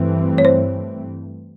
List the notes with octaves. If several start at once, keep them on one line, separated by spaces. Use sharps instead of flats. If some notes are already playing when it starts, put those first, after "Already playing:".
Already playing: G2 E3 A3 C4
C#5
C5